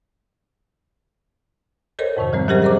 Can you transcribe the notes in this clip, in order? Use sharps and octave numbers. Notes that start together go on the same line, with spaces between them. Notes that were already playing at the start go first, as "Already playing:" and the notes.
A4 A#4 C5 C#5 D#5
F2 G#2 C3 D#3
F3 G3 C4
F#3 C#4 G4 A#4 C5 F#5
G#4 C5 D5 A#5 D6